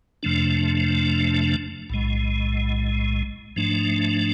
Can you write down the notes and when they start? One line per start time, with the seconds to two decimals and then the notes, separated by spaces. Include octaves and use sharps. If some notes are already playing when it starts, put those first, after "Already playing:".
0.23 F2 C3 F3 A3 D4
1.90 B1 A2 G#3
3.56 G#2 F3 A3 D4